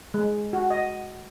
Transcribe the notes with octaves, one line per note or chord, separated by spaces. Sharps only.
G#3
F#4
D#5